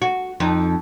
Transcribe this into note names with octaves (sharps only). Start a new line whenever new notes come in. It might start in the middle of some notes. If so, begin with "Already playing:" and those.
F#4
F2 D#4